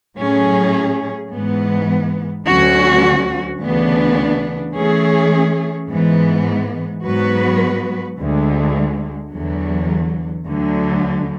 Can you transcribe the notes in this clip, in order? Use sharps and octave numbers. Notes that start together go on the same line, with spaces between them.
A2 F#3 C#4 G#4
G#2 E3 B3
D2 D3 F#3 C#4 F#4
D2 C#3 E3 B3 D4
E3 A3 C#4 G#4
G#2 E3 B3
G#2 F#3 B3 F#4 B4
D2 D3 G#3
E2 D3 F#3
D2 D3 F#3